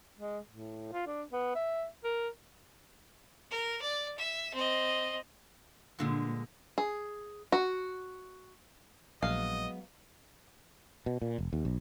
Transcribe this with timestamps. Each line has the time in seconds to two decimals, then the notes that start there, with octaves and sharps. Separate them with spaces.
0.18 G#3
0.49 A2
0.92 F4
1.07 D4
1.32 B3
1.55 E5
2.04 A#4
3.51 A#4
3.82 D5
4.18 E5
4.54 C4 D#5
5.99 G2 A#2 D3 G#3
6.78 G#4
7.52 F#4
9.22 A#1 F#3 G#3 B3 D#5 F5
11.06 B2
11.22 A#2
11.38 F1
11.53 D#2
11.65 B1